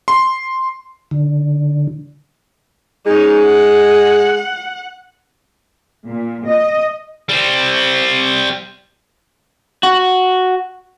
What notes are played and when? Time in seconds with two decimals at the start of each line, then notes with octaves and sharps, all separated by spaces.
0.08 C6
1.11 D3
3.06 G#3 C#4 D#4
3.43 F#5
6.08 A#2
6.46 D#5
7.29 G3 C4
9.83 F#4